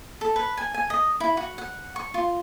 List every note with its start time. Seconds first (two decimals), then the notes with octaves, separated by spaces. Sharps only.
0.21 A4
0.36 B4
0.57 G#5
0.74 G#5
0.90 D#5
1.20 E4
1.37 F#4
1.58 F#5
1.96 C#6
2.14 F4